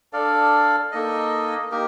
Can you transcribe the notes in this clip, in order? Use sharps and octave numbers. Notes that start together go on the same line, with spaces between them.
D4 A4 D5 F5
A#3 D#4 A4 D#5
A#3 D#4 G4 A#4